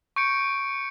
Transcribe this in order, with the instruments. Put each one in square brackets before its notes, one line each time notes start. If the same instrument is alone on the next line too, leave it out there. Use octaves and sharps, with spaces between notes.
[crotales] C#6 G6 C#7 D7